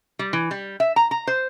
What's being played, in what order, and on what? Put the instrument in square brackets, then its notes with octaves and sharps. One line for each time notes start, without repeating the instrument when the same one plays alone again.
[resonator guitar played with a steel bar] G3
E3
G3
E5
A#5
A#5
C5